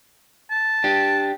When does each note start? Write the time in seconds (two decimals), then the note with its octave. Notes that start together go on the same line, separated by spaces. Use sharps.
0.51 A5
0.84 D4 G4